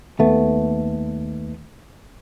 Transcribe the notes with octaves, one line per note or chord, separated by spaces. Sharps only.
D#2 A3 B3